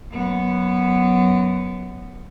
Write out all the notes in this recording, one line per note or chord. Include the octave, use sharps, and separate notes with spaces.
F#2 B3